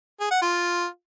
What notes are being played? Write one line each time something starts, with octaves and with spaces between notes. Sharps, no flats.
G#4
F#5
F4